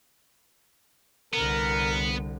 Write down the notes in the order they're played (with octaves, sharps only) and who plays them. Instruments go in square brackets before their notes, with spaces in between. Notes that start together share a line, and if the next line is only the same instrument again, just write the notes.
[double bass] C2 D3 [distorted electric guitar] B3 [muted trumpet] A#4